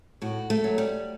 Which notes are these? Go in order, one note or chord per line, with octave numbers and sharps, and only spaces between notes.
A2 F#4
A3
F#3
G3